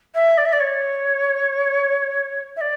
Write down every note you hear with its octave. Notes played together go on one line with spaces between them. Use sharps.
E5
D5
E5
D5
C#5
E5
D5